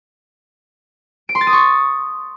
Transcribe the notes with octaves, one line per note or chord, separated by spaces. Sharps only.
D7
C6
A6
D#6
C#6